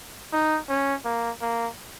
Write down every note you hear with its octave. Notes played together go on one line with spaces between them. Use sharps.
D#4
C#4
A#3
A#3